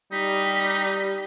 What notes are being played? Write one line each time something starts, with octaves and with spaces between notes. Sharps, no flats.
G3 D#4 B6